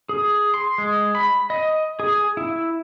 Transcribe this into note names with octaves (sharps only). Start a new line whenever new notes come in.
G#4
C6
G#3
B5
D#5
G#4
E4